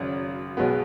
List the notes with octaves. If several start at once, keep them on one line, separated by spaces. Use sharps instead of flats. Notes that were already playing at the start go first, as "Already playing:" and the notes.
Already playing: G#1 F#2 C#3
B1 B2 G#3 B3